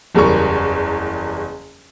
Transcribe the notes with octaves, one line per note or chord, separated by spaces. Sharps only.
F#1 E2 G3 A#4 C#6